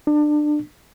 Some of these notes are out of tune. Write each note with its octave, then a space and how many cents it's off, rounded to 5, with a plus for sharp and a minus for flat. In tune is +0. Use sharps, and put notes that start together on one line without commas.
D4 +25